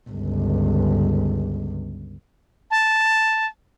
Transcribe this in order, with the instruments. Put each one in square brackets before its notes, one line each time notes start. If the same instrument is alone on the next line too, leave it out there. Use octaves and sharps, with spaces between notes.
[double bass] G1 C#2
[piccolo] A5